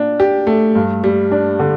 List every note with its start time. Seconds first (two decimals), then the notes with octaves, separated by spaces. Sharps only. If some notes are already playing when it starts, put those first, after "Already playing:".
Already playing: A#2 D4
0.20 G4
0.47 A3
0.75 G2
1.04 G3
1.31 D4
1.59 D3